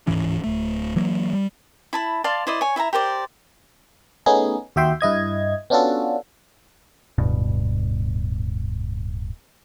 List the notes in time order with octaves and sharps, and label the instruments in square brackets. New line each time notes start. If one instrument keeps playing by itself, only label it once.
[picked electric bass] D1 G#2 E3 C#4
D1 A3
E3 F#3 A#3
G3
[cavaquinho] E4 A5 B5
D5 F5 A5 C6
E4 C5 D5 D#5
C#5 G#5
E4 E5 G5 A#5
G4 A#4 C5 D5
[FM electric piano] A3 B3 C#4 D#4 G#4
D#2 F#4 E5 G5 C6
G2 E4 D#5 G#6
B3 C#4 D4 F4 F#4 A4
[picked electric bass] D1 G2 B2